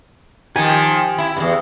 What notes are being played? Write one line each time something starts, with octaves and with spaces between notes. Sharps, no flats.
D#3 F3 G4 G#5
E4
E2 G2